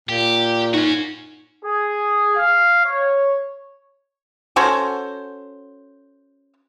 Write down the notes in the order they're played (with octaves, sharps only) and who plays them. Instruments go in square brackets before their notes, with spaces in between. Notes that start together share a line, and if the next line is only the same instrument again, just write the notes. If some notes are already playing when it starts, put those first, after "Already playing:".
[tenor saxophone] A#2 [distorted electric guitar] G4
[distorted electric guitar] C#4 F#4 [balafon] D#4
[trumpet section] G#4
F5
C#5
[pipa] C#4 F#4 A4 C5